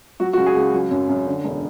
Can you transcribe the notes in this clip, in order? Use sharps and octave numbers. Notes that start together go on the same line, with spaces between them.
F#3 F#4
F#4
C#2
G#4
C#2
F#3
F#2
F#2
D3
E1